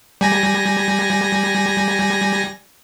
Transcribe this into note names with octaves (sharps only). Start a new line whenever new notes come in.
G3 G#5 A#6